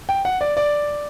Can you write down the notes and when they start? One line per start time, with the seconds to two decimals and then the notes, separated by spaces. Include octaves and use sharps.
0.09 G5
0.25 F#5
0.41 D5
0.57 D5